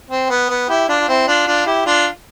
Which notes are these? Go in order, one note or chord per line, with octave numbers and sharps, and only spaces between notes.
C4
B3
B3
E4 G4
D4 F4
F4
C4 E4
D4 F4
D4 F4
E4 G4
D4 F4